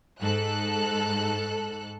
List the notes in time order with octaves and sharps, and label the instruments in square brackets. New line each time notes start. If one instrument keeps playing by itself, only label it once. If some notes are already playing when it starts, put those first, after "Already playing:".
[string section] G#2 A4 F#6